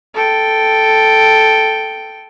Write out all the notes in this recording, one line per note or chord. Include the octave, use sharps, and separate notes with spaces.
A4 G5